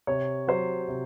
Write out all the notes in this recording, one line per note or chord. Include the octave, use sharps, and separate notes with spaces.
C3 C#5
F#3 C5
C3